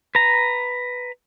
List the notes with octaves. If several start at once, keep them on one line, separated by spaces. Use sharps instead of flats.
B4 A#5